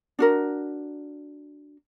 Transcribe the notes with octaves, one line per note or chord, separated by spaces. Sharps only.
D4 F#4 A#4